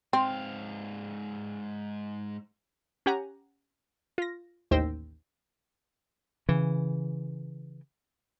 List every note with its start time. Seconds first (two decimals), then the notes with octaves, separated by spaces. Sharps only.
0.13 G#2 C4 F5
3.06 C#4 G4 F#5 G#5 A#5
4.18 F4 A#6
4.71 A1 D#2 C5 G5 E6 A#6
6.49 C#3 E3